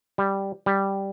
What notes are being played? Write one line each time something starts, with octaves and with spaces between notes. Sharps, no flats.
G3
G3